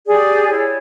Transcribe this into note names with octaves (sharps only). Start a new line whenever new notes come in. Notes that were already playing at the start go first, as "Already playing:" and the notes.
G4 G#4 D5
E4 C#5